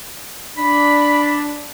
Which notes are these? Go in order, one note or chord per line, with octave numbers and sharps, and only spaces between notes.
D4 B5